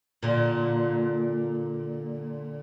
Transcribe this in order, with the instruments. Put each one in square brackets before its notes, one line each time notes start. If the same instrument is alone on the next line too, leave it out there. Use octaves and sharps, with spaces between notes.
[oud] A#2 D3